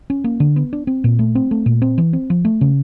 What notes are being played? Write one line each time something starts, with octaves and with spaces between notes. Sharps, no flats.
C#4
A#3
D3
B3
D4
C4
A#2
A3
C4
A3
A#2
C4
E3
C4
F3
A3
C#3